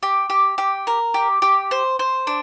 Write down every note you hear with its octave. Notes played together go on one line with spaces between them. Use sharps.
G4
G4
G4
A#4
G4
G4
C5
C5
D4